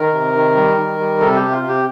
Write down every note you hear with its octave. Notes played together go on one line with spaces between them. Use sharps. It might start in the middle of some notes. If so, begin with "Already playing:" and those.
Already playing: D#3 A#4
C3
D#3
G3
D#3
G3
C3 A4
G4
C3
F4
C3
G4